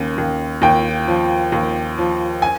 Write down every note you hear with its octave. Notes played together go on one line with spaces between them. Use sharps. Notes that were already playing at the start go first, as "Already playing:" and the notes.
Already playing: D#2 C#3
D#2
D#2 G5
F3
D#2
F3
G#5